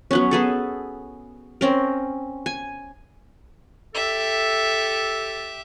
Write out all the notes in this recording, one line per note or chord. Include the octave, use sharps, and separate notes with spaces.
F#3 B3 C#4
B3 G#4 A4
C4 C#4 A#4
G#5
G4 A4 E5